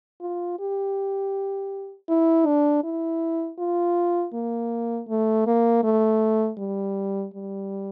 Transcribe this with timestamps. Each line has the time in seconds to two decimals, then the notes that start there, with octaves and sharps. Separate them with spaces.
0.21 F4
0.59 G4
2.09 E4
2.46 D4
2.83 E4
3.59 F4
4.33 A#3
5.08 A3
5.46 A#3
5.83 A3
6.58 G3
7.34 G3